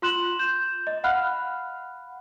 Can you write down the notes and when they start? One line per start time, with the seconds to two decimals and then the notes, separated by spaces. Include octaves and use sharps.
0.02 F4 C6 F#6 E7 F#7
0.39 G6 E7
0.87 D#5
1.04 F5 F#5 B5 F6 F#6